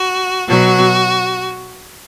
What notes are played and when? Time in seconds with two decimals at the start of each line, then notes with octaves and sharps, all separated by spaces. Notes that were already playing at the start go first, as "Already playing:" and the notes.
Already playing: F#4
0.48 B2 F#3 F#4